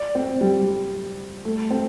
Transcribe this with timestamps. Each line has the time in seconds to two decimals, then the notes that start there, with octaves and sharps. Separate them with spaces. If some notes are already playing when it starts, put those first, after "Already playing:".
Already playing: D5
0.15 C4
0.41 G3
1.45 A3
1.71 C4